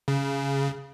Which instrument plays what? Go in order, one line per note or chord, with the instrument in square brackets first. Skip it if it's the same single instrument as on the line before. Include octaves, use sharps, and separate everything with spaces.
[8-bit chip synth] C#3